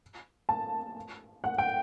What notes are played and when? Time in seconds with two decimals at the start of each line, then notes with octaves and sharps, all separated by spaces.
0.49 A5
1.44 F#5
1.58 G5